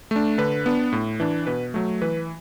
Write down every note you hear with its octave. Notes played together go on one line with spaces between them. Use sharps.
A3 D4
D3 B4
B3 D4
A2
E3 D4
B2 B4
F#3 A3
E3 B4